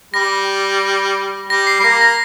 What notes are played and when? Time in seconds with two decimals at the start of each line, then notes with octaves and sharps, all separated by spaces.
0.14 G3 A#6
1.50 G3 A#6
1.67 C7
1.80 G3 C7
1.84 A#3 A#6
2.01 A#6